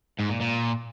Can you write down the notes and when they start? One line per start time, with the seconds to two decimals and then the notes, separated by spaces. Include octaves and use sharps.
0.20 G#2
0.31 A#2
0.41 A#2